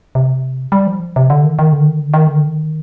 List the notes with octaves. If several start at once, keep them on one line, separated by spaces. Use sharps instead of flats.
C3
G3
F3
C3
D3
D#3
D#3
D3
D#3
D3
D#3
D3
D#3